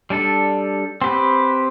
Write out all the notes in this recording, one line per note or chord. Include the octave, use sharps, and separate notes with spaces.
G3 D4 A4
C4 G4 B4